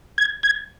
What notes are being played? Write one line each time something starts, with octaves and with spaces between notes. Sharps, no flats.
G#6
G#6